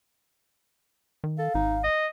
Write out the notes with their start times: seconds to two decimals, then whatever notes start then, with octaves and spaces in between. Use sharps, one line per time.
1.24 D#3
1.38 A4 F5
1.55 G#1 D#4
1.84 D#5